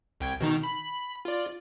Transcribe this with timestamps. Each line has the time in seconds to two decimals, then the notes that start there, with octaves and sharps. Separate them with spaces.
0.20 C2 G5 G#6
0.40 B2 D#3 D#4
0.63 B5
1.25 F4 D5